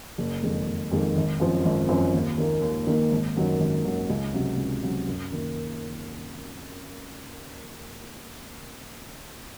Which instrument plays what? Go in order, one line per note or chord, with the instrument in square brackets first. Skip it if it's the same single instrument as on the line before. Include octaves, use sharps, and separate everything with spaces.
[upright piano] F#1
F2 D#3 G#3
F#1
F2 D#3 G#3
G#1
F#2 F3 C4
G#1
F#2 F3 C4
D#2
D#3 A#3
D#2
D#3 A#3
G#1
F#2 D#3 F#3 A#3
G#1
F#2 D#3 F#3 A#3
C#2
C3 F#3 C#4
C#2
C3 F#3 C#4
F#2
D#3 A#3